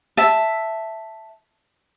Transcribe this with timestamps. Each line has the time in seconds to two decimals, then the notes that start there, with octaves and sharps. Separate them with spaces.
0.17 E5 A5